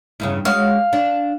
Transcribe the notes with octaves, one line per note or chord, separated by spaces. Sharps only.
E2 G2 C#3
G#3 F#4 C#5 F5
D4